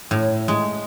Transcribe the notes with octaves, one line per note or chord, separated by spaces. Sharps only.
A2
G#3